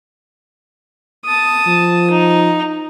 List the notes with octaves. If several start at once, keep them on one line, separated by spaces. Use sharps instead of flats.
A5 D#6
F3
D#4